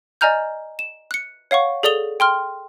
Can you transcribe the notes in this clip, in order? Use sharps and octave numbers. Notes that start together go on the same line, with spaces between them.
D5 D#5 G#5 A#5 F6 G6
E7
F#6 C#7
C#5 F5 F#5 C#6
G#4 A4 D5 D#6 F7 G7
G5 C6 F6